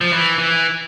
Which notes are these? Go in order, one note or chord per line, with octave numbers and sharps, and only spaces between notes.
F3
E3
E3